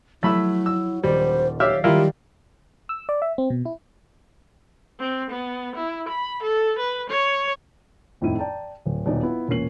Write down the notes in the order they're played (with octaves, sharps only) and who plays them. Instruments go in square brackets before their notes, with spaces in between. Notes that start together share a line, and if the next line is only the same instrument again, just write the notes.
[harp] F#3 [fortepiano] A3 B5 E6 [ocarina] E4
[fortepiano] E6
[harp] D#1 D5 D7 [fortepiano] G3 [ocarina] C5
[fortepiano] G4 E5 F6 [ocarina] C#5 [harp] D5 F5
[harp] D#3 G3 [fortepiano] E4 F4 A#4 [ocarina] G4
[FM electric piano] E6
D5
E5
C4
B2
E4
[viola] C4
B3
E4
B5
A4
B4
C#5
[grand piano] D#1 F2 A2 D#4 E4 D#7
D5 G5 A5 A#5
D1
D#1 B2 D#4 D5 D#5
B3 E4 F4
E1 A#2 A#3 C#4 C7 F#7